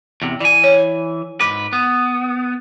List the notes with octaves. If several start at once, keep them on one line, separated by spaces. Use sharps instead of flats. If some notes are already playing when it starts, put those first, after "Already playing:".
E2 C3
E3 D5 G#5
C#5
G#2 B4 D6
B3